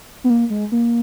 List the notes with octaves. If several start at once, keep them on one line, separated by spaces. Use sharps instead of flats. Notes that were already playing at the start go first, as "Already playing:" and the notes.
B3
A#3
G#3
A#3